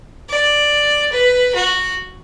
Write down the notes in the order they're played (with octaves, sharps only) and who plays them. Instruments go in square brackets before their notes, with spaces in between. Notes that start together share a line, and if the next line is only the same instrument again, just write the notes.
[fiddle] D5
B4
F#4